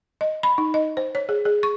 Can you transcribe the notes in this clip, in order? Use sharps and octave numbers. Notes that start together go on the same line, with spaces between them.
D#5
B5
D#4
D#5
C5
C#5
G#4
G#4
C#6